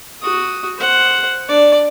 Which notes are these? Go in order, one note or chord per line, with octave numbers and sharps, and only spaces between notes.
F#4 D#6
C5 F#5
D4 D5